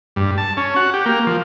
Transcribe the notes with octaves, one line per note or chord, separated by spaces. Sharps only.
G2
A5
C#4
F#4
G4
A#3
F3